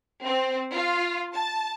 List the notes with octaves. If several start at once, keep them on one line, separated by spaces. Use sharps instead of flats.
C4
F4
A5